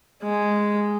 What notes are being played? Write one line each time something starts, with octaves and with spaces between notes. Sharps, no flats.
G#3